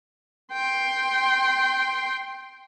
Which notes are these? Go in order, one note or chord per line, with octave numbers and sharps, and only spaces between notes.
G5 C6